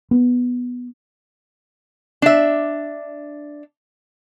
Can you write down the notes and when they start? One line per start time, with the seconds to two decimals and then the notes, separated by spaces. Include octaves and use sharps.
0.11 B3
2.22 D4 E5